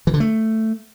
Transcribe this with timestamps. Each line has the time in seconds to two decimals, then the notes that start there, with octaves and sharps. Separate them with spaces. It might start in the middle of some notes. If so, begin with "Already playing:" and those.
0.07 E3
0.14 D3
0.20 A3